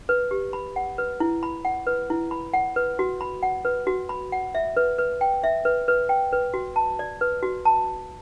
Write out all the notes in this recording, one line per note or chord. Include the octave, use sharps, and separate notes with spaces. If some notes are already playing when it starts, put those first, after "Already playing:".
B4
G4
B5
F#5
B4
E4
B5
F#5
B4
E4
B5
F#5
B4
F#4
B5
F#5
B4
F#4
B5
F#5
E5
B4
B4
G5
E5
B4
B4
G5
B4
F#4
A5
D5
B4
F#4
A5